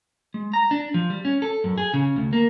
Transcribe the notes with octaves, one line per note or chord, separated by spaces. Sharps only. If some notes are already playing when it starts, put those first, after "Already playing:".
G#3
A#5
D4
F3
G3
C#4
A4
F#2
G#4
C#3
D2
A#3